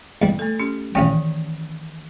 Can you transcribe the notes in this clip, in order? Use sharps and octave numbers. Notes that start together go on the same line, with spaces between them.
E2 G3
A3 A4
C#4 G4
A1 D#3 E3 C#4 G5